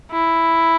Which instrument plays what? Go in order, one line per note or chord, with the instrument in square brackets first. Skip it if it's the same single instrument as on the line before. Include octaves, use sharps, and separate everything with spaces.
[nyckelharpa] E4